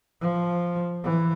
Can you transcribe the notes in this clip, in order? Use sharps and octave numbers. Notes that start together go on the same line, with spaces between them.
F3
E3